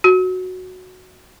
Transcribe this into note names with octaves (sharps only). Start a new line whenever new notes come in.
F#4